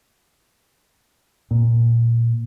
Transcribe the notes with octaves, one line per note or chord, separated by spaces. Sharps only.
A#2